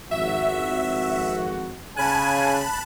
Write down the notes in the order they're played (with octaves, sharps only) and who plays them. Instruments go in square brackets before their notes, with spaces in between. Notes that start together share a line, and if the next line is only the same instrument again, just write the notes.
[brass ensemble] G#1 F2 F#4 [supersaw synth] E5
[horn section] C#3 G#5 [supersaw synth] A5 B5 F#6